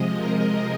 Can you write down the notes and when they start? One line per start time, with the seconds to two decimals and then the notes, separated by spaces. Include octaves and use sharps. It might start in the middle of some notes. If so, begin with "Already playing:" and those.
Already playing: C3 F3 G#3 D#5
0.16 A#4